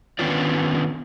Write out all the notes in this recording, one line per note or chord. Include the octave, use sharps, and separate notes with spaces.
D3 D#3 B3 C#4 F4 D5